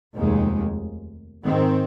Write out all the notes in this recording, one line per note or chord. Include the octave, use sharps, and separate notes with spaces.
F1 D#2 D#3 G#3
G#2 D#3 C4